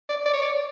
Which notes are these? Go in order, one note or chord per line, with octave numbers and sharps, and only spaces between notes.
D5
D5
C#5
D5